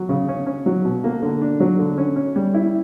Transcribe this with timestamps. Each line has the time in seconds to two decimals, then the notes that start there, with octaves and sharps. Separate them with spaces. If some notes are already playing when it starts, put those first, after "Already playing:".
Already playing: F#3
0.09 C#3
0.28 C#4
0.46 C#4
0.66 F#3
0.85 B2
1.04 A#3
1.22 D3
1.42 D4
1.60 F#3
1.79 D3
1.98 C#4
2.16 C#4
2.36 G3
2.54 E4